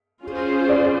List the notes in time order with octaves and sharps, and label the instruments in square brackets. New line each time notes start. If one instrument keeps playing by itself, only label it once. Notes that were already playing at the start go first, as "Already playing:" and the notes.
[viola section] C#4 F4 G#4 C5
[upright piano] D5